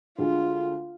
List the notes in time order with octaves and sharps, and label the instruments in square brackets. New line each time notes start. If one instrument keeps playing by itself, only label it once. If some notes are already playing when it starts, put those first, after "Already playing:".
[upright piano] D2 D3 G#3 [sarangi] F4